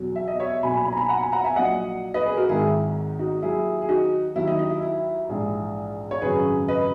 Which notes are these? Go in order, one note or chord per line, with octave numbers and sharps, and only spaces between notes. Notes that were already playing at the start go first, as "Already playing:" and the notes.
Already playing: E2 B2 F#3
E5
D#5
C#5 E5
B1 A#2 F#3 G#5 B5
G#5 B5
G#5 B5
A#5
G#5 B5
F#5 A#5
G#5 B5
F#5 A#5
E5 G#5
A#1 A#2 F#3 D#5 F#5
B4 D#5
G#4 B4
F#4 A#4
G#1 G#2 D#3 E4 G#4
D#4 F#4
D#2 D#3 F#3 E4 G#4
G#4
D#4 F#4
D#2 D#3 F#3 E4
D#4
D#4
E4
E4
A#1 G#2 E3 E4 G#4
C#5
G#1 F#2 C#3 F#3 G#4 B4
B4 D#5